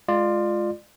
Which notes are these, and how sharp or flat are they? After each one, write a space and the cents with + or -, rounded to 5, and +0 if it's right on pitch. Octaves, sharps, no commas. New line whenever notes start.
G#3 +15 F4 +0 D5 +30